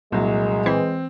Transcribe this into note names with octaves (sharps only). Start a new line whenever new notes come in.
C2 A#2 F#3 G#3
E3 C4